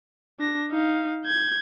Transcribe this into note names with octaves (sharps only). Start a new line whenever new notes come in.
D4 A#6
D#4 F5
G6 G#6